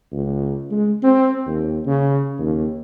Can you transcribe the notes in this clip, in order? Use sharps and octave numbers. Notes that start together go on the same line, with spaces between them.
C#2
G#3
C4
D#2
C#3
D#2